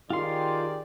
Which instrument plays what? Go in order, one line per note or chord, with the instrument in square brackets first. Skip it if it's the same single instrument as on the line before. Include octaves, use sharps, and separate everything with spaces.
[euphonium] D#3 [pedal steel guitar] F4 C6 [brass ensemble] G4 G#4 D5